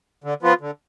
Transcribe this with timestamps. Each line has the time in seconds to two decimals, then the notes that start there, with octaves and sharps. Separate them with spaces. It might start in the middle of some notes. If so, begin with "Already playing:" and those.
0.24 D3
0.42 F3 B3 F4
0.61 D3